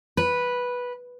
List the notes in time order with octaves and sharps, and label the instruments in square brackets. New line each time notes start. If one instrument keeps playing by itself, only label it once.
[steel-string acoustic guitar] B4